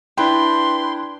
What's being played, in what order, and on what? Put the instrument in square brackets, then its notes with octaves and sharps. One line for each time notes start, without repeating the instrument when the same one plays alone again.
[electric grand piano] D4 E4 G5 [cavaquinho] B4 [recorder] C6